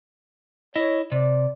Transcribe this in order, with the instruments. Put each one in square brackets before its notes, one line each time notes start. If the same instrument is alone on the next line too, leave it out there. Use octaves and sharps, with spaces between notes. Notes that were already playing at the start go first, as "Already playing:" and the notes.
[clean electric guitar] E4 D#5 [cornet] C#5
[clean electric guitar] C3 [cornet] D5